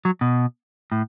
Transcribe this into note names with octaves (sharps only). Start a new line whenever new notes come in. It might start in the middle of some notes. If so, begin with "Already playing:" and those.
F#3
B2
A2